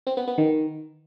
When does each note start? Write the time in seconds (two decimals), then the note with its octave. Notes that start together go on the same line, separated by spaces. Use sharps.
0.07 C4
0.17 B3
0.27 B3
0.38 D#3